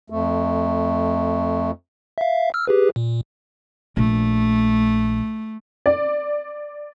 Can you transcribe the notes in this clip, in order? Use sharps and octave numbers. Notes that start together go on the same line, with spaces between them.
F2 A3
E5 F5
E6 F6
G4 G#4 B4
A#2
A#1 A3
D5